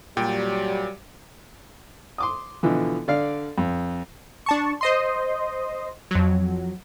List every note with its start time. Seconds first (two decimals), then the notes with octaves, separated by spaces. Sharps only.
0.17 A#2 F#3 G3 G5
2.18 C6 D6 D#6
2.63 B2 D3 E3 F3
3.08 D3 D5 F5
3.58 F2
4.46 D4 A5 C#6
4.81 C5 D#5 C6
6.11 F2 F#3